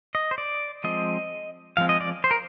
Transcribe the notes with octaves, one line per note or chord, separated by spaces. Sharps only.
D#5
C5
D5
F3 G#3 C4 D#5
F3 G#3 C4 F5
D#5
D5
C5
A#4